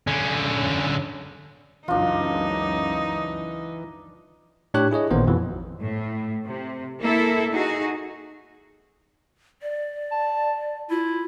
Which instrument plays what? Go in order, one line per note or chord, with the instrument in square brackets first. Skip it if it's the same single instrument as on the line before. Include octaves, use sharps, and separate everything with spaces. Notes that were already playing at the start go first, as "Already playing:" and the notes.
[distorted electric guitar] D3 C#4
[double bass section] C#2 F#2 [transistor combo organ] E3 [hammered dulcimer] D4 F4 [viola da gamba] D#4
[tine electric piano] A2 D4 G4 C#5 F#6
E4 G#4 C#5 D#5
A1 A#2 D#3 B3 C5
F2 B2 E3
[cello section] A2
C3
A#3 E4 A4
D#4 F#4 G#4
[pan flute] D5
[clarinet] A5
[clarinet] E4 [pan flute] F4